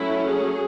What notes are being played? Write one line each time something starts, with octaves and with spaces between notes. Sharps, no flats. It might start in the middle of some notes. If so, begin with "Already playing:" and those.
Already playing: F#3 A3 C#4 E4
G#4